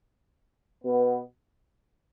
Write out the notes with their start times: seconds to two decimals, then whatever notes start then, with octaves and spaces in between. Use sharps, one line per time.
0.84 B2 B3